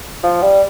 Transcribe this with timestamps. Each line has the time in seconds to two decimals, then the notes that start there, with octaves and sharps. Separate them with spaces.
0.23 F3
0.42 G3